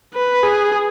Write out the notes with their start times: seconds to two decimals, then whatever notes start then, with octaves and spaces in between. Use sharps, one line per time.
0.14 B4
0.43 G#4